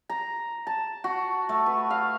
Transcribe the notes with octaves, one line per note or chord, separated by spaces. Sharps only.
A#5
A5
F#4
A3
B4
F5